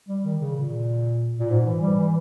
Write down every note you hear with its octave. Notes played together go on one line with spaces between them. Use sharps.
G3
D#3
C#3
A#2
A#2
G#2
E3
G3
E3